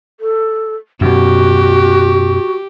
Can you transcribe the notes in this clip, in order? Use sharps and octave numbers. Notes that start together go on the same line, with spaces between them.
A4
F#2 B2 F#4 G4